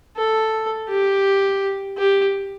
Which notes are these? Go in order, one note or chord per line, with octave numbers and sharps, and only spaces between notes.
A4
G4
G4